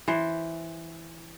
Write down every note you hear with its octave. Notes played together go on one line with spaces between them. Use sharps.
E3 C5